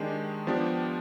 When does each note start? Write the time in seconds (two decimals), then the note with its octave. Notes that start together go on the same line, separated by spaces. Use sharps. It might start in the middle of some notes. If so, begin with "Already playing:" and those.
Already playing: D#3 G#3 D4 G4
0.47 F3 B3 D4 G4